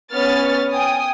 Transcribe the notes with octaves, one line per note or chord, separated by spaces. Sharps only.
B3 C#4 C#5 F6 A6
G5 G#5 D#6